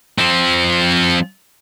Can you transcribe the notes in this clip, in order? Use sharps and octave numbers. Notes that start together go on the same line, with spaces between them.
F3 C4